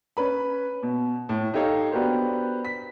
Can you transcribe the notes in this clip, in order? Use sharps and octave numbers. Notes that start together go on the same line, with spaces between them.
C#4 B4 B5
B2
A2
D#4 G4 A4 C#5 D#5 F5
B3 D4 F#4 G4 A#4 C5
B6